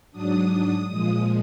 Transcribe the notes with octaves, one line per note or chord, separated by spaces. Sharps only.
G#2 F#3 D4 D#6
D#6
A#2 F3 G#3 D#6